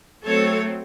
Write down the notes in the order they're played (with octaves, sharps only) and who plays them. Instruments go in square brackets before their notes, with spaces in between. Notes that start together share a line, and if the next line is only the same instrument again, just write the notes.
[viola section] F#3 A3 C4 A4 C#5